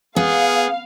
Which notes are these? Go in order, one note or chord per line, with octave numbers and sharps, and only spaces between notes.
B3 G#4 F5